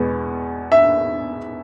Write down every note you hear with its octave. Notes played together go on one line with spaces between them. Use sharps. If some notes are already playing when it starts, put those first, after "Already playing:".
Already playing: E2 B2 G#3 B3
E5